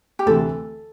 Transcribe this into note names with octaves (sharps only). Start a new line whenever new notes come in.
G4
D2 C3 E3 A4